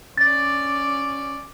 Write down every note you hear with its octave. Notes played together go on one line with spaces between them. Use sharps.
C#4 D5 A6